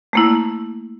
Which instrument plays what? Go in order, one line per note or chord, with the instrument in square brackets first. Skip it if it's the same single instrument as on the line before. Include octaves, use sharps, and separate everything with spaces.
[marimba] A3 A#3 E4